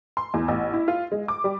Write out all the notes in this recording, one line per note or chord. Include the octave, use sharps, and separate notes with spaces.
C6
E2
A1
E4
F4
G#3
D6
G3